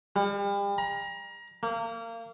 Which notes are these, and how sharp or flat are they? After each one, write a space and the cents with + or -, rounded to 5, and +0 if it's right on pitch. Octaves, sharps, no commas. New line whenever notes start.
G3 +40
A#5 +30
A#3 -25